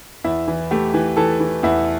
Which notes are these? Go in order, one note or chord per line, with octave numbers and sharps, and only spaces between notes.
E2 E4
E3
A3 G4
E3
E3 A4
E3
E2 E4